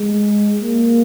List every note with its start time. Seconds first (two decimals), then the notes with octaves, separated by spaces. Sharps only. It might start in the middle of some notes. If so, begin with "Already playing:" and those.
Already playing: G#3
0.61 A#3